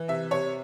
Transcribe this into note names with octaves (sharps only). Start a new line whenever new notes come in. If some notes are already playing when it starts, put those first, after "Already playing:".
Already playing: E3
C3 E5
C3 C#5